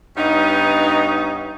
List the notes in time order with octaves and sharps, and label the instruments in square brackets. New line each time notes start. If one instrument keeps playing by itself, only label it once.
[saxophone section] G2 B3 C#4 D#4